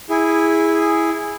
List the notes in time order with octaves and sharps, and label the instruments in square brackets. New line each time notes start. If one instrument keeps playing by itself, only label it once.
[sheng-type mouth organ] E4 G#4